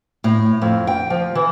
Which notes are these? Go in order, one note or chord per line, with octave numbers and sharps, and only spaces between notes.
A2
F2
G5
F3
E3